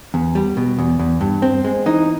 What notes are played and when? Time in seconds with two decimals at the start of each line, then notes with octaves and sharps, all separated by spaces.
0.14 E2
0.35 G3
0.57 B2
0.78 E2
0.99 E2
1.21 G2
1.42 C4
1.64 G#3
1.86 E3 D#4